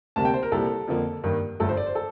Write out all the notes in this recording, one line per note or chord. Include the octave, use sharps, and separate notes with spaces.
D2 C3 G3 A#3 A5
G5
C5
A#4
C2 A#2 G3 A4
F2 D3 F3 A#3
G2 D#3 A#3
G1 G2 F3 A3 A4
C5
D5
C5
A4